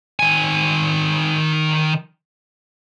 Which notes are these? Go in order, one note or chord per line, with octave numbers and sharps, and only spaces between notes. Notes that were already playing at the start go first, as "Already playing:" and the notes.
D#3 G#5